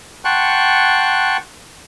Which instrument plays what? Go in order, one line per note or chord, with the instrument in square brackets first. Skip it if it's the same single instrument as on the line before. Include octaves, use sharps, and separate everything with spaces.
[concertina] F#5 G5 A5 C6 C#6 F#6